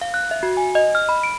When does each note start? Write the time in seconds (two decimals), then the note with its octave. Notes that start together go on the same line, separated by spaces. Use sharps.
0.01 F5
0.14 F#6
0.31 E5
0.43 F#4
0.57 G#5
0.75 D#5
0.95 F6
1.09 B5
1.24 D7